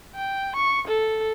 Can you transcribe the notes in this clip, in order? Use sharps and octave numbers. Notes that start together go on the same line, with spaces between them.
G5
C#6
A4